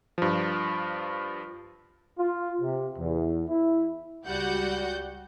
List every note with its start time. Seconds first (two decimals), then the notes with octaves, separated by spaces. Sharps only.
0.18 G2 F3
2.18 F4
2.61 C3
2.99 E2
3.49 E4
4.25 C#2 G3 F#4 D5 F#5 G6